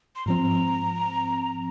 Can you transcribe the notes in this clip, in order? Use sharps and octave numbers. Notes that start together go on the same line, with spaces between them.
C6
G#2 F3 C4 A#5